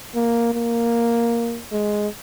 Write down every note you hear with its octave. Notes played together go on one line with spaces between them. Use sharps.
A#3
A#3
G#3